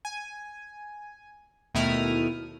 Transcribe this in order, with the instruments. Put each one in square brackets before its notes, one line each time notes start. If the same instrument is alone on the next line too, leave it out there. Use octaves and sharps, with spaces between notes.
[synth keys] G#5
D#2 B2 A3 E4 D#6 F6